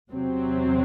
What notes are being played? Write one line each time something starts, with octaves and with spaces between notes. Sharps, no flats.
E2 C3 F#3 C4